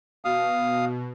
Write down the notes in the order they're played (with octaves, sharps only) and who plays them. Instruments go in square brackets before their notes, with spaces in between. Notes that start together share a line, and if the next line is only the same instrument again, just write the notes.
[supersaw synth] B2 [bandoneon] F5 D#6